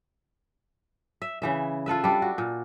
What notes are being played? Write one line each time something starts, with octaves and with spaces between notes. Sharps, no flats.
E5
C#3 E3 E5
F4 A4 B4 E5
G3 D4
F#4
A#2